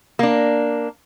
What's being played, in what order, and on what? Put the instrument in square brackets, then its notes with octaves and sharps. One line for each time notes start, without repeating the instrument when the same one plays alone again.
[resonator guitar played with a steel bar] A#3 D4